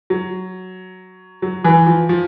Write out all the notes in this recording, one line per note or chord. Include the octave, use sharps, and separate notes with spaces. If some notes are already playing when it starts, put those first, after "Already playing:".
F#3
F#3
E3
F3
F3